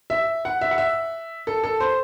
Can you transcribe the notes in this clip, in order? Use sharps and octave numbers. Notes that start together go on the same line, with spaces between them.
E5
F#5
E5
F#5
E5
A4
A4
C5